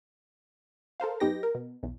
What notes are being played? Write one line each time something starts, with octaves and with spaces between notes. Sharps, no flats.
A4 A#4 C5 F5
F#2 B3 D#4 G4 G5 A#6
A#4
B2
B1 E2